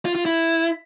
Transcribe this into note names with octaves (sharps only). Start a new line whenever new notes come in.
F4
F4
E4